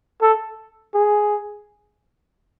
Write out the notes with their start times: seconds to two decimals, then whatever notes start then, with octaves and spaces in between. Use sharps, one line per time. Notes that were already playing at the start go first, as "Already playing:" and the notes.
0.22 A4
0.94 G#4